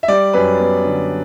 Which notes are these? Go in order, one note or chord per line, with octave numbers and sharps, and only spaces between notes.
E5
G3 D5
F#2 B4
B3
D3